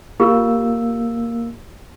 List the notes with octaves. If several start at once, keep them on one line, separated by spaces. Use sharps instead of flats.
A#3 F4 G4 E6